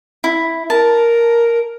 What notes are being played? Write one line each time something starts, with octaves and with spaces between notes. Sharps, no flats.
E4
A#4 A5